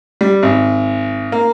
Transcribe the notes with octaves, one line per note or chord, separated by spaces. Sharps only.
G3
G#1
A#3